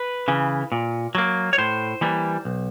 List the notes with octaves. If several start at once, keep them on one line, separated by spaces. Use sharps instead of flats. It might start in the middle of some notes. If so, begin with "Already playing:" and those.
Already playing: B4
C#3 E3
A#2
F#3 A#3
C#5
A2 C5
E3 G3 A#3
B1